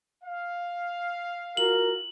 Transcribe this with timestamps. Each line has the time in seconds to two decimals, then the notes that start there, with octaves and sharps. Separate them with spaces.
0.23 F5
1.57 F4 F#4 A#4 F#7